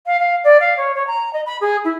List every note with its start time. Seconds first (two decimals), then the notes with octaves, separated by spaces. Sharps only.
0.06 F5
0.19 F5
0.44 D5
0.60 F5
0.77 C#5
0.94 C#5
1.07 A#5
1.33 D#5
1.46 B5
1.61 G#4
1.84 E4